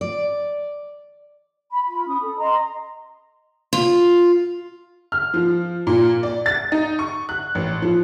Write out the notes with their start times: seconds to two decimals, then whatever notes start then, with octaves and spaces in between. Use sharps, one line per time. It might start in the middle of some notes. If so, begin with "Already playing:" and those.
0.01 D5
1.70 B5
1.87 F4 B5
2.07 C#4 B5 D#6
2.20 A4
2.39 D#5 A#5 C6
3.73 F4
5.12 F6
5.34 F3
5.87 A#2
6.23 D5
6.46 A6
6.72 D#4
6.99 C#6
7.29 F#6
7.55 A1
7.82 F3